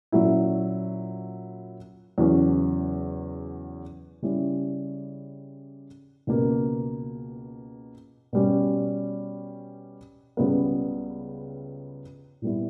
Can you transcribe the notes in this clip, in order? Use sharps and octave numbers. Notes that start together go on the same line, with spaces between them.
A#2 F#3 C#4 E4
E2 C#3 F#3 C#4
C#3 G3 C#4 E4
C#2 B2 A#3
B2 G3 C#4
C#2 C#3 G3 B3
A#2 G3 B3 E4